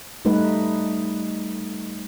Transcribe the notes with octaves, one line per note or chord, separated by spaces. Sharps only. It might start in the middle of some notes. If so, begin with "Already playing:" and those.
G3 A3 D#4 B4